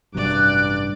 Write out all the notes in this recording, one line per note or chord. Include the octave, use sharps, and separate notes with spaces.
A1 G2 C3 F#3 D5 D6 F#6